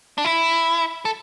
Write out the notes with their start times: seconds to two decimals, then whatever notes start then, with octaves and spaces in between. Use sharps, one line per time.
0.18 D4
0.25 E4
1.05 A4